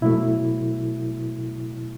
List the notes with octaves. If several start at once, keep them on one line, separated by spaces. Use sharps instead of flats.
B2 F#3 A3 E4